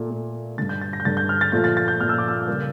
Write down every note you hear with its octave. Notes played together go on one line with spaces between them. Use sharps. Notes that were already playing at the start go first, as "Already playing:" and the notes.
Already playing: A#2 A3
A#2 A3
G2 D3 A3 A6
G6
A6
A#6
G6
G2 D3 A3 A6
G6
F6
A6
A#2 F3 A3 G6
A6
A6
G6
A#2 F3 A3 F6
E6
D6
E6
C#3 G3 A#3